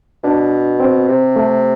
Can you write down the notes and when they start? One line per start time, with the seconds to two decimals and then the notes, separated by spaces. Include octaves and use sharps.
0.23 B2 D4
0.80 C4
1.08 C3
1.36 A3